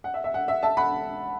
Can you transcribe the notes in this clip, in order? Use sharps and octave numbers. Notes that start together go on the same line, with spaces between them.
F#5
E5
E5
F#5
E5
E5 A5
F#5 B5